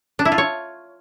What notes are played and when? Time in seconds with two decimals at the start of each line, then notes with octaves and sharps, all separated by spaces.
0.19 D4
0.25 E4
0.32 F4
0.38 C#5